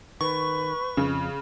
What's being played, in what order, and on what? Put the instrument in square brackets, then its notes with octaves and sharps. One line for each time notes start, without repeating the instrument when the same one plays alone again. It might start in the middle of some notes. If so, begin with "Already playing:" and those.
[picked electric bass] D#3 [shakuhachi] B4 [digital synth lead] C#6
[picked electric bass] F2 [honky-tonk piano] C#3